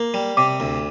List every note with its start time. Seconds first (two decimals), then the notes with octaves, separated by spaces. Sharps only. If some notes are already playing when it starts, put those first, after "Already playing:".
Already playing: A#3
0.14 G3
0.37 C3 D6
0.60 D2